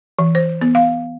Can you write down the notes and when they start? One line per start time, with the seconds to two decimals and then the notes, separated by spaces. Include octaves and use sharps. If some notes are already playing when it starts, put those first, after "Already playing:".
0.19 E3
0.35 C5
0.61 B3
0.75 F5